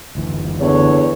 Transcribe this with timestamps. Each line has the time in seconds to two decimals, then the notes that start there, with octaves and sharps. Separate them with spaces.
0.15 F#1 D2 E3
0.61 E2 D3 C#5